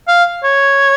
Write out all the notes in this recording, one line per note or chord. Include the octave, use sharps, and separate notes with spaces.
F5
C#5